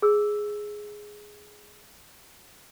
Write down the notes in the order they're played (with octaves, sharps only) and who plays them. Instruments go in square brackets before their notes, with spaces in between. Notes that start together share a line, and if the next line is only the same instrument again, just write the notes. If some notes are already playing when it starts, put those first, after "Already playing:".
[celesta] G#4 E6